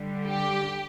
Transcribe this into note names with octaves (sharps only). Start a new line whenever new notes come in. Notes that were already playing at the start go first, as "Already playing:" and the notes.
Already playing: D3 G3
G4